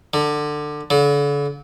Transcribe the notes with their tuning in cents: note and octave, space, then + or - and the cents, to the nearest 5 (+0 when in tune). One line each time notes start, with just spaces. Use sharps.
D3 +20
D3 -40